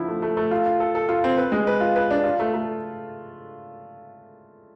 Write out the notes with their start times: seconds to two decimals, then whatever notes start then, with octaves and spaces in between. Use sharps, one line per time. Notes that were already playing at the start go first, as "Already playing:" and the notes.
Already playing: D3 F3 E4
0.09 A3
0.22 A3
0.37 A3
0.51 F4
0.66 F4
0.80 A4
0.95 A4
1.09 F4
1.24 C4
1.37 B4
1.52 G#3
1.67 B4
1.81 F4
1.96 B4
2.11 D4
2.24 F4
2.39 A3
2.54 A3